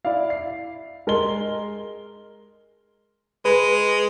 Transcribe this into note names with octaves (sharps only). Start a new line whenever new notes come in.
E4 D5 F5
C7
G#3 A#4 D#5 C6 G7
G#3 B4